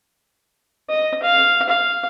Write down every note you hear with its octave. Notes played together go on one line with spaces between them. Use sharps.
D#5
F5
F5